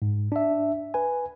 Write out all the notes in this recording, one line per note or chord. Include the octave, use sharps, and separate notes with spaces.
G#2
D4 E5
B4 G#5